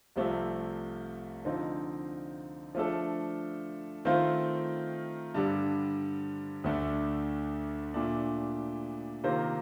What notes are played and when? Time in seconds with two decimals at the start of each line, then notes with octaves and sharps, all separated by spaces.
0.16 C2 C3 F3 A3
1.45 D3 F3 C4 D#4
2.75 F3 A3 D4 A4
4.05 D#3 A3 C4 F4 C5
5.35 G2 D3 G3
6.64 D2 D3 A3 D4
7.94 A#2 A3 D4
9.24 C3 D#3 A#3 F4 C5